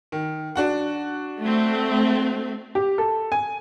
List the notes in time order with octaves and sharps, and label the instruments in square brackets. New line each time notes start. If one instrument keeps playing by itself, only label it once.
[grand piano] D#3
D4 F#4 F#5
[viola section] A3 C4
[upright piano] G4
A4
G#5